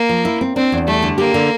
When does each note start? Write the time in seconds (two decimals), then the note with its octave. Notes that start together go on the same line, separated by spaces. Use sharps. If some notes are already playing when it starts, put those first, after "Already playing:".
Already playing: A#3
0.09 F3
0.25 E4
0.41 C4
0.56 C4 D4
0.72 E2
0.87 G3 A3
1.02 D3
1.18 A#3 G4
1.34 D3